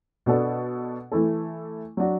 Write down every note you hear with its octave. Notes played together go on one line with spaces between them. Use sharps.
B2 B3 D4 A4
E3 A3 E4 A4
F#3 D4 F#4